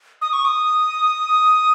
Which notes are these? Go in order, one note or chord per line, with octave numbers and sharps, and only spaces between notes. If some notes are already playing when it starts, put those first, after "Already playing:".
D#6
C#6
D#6